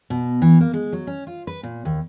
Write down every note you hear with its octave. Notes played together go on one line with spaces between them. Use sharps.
B2
E3
A#3
G#3
F#3
C#4
F4
B4
A#2
D#2